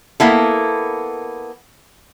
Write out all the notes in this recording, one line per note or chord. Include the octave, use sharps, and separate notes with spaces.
A#3 B3 E4 A4